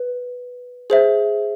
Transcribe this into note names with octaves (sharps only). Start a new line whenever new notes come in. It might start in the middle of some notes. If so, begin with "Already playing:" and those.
Already playing: B4
G#4 C5 E5